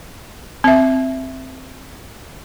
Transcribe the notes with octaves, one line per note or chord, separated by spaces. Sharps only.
C4 E5